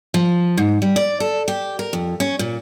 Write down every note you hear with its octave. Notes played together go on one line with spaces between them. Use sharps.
F3
G#2
G3
D5
A4
G4
A#4
F2
C#4
A#2